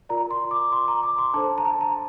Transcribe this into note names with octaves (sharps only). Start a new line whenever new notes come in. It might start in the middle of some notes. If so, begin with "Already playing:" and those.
F4 A#4 D5 A#5
C6
D6
C6
A#5
D6
C6
D4 A4 C5 A5
A#5
A5
A#5